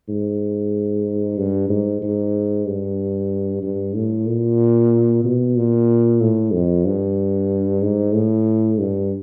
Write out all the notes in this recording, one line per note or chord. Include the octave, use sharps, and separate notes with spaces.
G#2
G2
G#2
G#2
G2
G2
A2
A#2
B2
A#2
A2
F2
G2
G#2
A2
G2